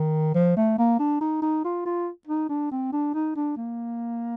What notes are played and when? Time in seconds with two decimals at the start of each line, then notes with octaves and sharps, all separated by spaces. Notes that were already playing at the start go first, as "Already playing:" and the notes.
Already playing: D#3
0.34 F3
0.56 A3
0.78 A#3
0.99 D4
1.21 D#4
1.42 D#4
1.64 F4
1.85 F4
2.27 D#4
2.49 D4
2.71 C4
2.92 D4
3.14 D#4
3.36 D4
3.57 A#3